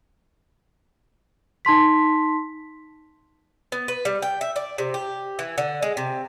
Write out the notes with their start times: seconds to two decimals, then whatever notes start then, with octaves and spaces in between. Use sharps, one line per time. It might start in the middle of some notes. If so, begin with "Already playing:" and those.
1.65 D#4 A5 C6 B6
3.72 B3
3.88 B4
4.05 G3
4.22 G5
4.41 E5
4.56 D5
4.78 C3
4.94 G4
5.39 E3
5.58 D3
5.82 G#3
5.97 C3